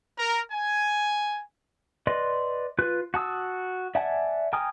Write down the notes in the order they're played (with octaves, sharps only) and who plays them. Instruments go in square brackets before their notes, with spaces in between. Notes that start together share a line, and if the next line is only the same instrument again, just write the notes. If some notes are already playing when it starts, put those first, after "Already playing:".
[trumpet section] A#4
G#5
[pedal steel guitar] B4 D5 D#5 C6
F4 B4 F#6
F#4 A5 D#6 E6
D5 E5 F#5 G#5 A5
G5 G#5 A#5 D#6 F6